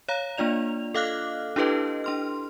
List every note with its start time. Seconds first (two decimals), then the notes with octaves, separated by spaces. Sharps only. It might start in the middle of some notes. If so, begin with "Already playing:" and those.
0.09 C#5 F5 A#5
0.37 A#3 D4 F4 D5 F7
0.95 A4 D#5 F5 D6 F6 F#6
1.56 D4 E4 G4 A4 B4 D#5
2.04 D4 C6 F6